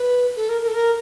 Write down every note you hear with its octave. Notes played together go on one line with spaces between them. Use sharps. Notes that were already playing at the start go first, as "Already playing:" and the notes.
Already playing: B4
A4
A#4
A#4
A4
A#4